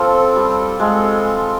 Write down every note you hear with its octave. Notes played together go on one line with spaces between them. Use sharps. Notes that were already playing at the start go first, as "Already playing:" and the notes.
Already playing: F3 C4 F4 A4
G3
G#3 C4 F4 A4